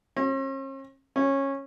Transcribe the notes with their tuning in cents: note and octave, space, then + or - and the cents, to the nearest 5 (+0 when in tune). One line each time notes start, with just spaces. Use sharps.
C#4 -45
C#4 -15